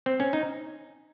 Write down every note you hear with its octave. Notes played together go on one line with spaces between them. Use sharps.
C4
C#4
D#4